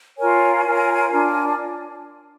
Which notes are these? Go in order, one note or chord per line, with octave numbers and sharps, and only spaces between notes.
F4 A#4 C#5 G#5
F4 A#4 C#5
D4 F4 A#4